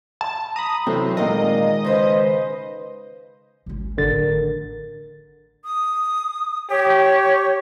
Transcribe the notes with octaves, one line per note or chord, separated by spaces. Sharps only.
A5
A#5 B5 D#6
C3 E3 F#3 A3 C4
A#2 D#3 G#3 A#4 D#5 F5
C#3 B4 C5
G#1 C#4
A1 D3 D#3 A#4 A6
D#6
G4 C#5